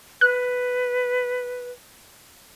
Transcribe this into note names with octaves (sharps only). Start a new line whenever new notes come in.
B4 F#6